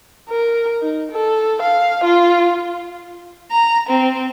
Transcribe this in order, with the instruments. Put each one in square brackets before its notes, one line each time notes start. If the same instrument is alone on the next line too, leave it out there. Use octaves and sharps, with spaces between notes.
[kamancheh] A#4
D#4
A4
F5
F4
[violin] A#5
C4